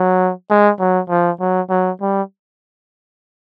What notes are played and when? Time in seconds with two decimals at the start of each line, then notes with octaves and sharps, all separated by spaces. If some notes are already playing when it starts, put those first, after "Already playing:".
Already playing: F#3
0.50 G#3
0.80 F#3
1.10 F3
1.40 F#3
1.70 F#3
2.01 G3